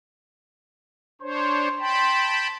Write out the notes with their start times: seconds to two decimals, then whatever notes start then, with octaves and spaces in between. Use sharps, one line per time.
1.22 D4 C5 C#5 C6
1.79 G5 A5 B5